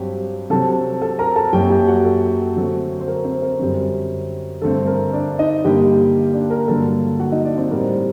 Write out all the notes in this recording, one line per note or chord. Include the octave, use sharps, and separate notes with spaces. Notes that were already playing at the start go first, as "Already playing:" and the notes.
Already playing: G2 F#3 C4 G4
C3 F#3 C4 A4 A5
A4 A5
A#4 A#5
A4 A5
F#2 F#3 A#3 G4 G5
G4 G5
F#4 F#5
A4
D3 F#3 A3 C4
C5
A#4
C4 C5
A#4
F#2 D3 G3 C4
G2 D3 A3 C4 A4
A#4
D4 D5
D#4 D#5
G2 D3 G3 A#3 G4 G5
D4 D5
A#4
G2 D3 F#3 A#3 A4
F#4 F#5
D#4 D#5
D4 D5
C4 C5
A2 G3 C4 A#4